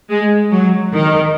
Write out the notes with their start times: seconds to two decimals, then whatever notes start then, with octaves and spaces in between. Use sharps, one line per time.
0.10 G#3
0.51 F#3
0.92 D#3